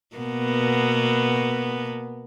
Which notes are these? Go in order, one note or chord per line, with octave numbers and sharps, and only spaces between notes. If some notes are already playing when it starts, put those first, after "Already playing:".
B2 A#3 B3